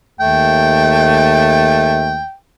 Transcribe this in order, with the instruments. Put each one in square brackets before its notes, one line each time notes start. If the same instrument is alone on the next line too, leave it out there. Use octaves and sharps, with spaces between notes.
[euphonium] D#2 [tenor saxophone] A3 [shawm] G5